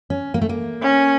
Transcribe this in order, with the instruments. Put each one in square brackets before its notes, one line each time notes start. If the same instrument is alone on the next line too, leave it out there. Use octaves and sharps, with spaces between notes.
[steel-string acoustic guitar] C#4
A#3
A3
A#3
[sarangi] C#4